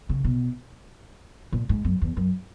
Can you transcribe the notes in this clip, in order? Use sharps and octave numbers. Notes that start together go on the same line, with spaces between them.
C#3
B2
A#2
G#2
F#2
E2
F#2